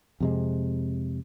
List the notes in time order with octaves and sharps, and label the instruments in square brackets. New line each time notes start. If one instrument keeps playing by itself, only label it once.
[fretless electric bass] F2 C3 G#3